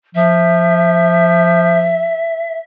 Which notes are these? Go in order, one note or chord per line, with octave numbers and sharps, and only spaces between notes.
F3 E5